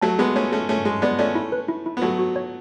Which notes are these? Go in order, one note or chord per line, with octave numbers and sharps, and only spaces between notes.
F#3 A3 A5
G#3 B3 G#4
A3 C#4 C#5
A3 C#4 G#4
A3 C#4 G#4
G#3 G#4
G#3 B3 D5
A3 C#4 D5
E4
B4
E4
E4
B3
F#3 A3 F#4
F#4
C#5